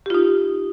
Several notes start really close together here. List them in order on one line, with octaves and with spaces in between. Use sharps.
G4 F4 D#4